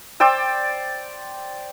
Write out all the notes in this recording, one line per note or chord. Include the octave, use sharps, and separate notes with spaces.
C5 D5 G5 E6